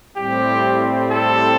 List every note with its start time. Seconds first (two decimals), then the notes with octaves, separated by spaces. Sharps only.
0.16 A2 G3 C4 G4
1.10 A4